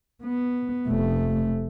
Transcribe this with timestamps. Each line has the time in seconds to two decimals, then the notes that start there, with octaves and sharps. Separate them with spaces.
0.24 B3
0.88 F1 A3